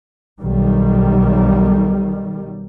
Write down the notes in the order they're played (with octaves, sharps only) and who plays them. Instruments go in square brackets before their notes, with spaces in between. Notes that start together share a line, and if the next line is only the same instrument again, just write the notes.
[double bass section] B1 D#3 G3